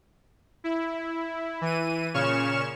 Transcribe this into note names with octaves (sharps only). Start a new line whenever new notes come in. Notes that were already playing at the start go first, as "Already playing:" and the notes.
E4
E3 D#7
A#2 C#3 C#4 C#6 F6 E7